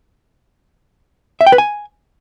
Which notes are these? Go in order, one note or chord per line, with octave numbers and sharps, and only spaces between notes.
E5
G5
B4
G#5